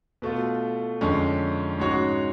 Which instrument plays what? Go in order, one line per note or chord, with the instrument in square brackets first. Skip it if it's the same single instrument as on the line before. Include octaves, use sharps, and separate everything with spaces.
[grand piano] B2 A3 F4 A4
F2 D3 G#3 C#4
G#2 G#3 C#4 F#4 C#5